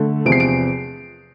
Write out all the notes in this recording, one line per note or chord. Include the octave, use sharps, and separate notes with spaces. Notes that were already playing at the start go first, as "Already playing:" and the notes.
Already playing: D3 A3
E2 C3 F3 D7
C7
D7